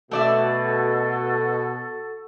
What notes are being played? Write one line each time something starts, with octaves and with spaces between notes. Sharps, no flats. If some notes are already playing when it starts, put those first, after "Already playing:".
B2 A3 F#4 A4 D5 E5